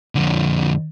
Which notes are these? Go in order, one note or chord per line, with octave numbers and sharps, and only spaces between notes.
F2 D3